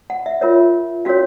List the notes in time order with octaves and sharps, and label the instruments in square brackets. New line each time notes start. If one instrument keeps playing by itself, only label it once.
[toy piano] F#5
E5
F4 A#4 C#5 E5
C#4 F#4 A#4 C#5 F5